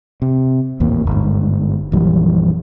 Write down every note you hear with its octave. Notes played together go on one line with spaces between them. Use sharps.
C3
A1 D#2 A#2 A#3
G1 G#2
A#1 F#2 E3 G3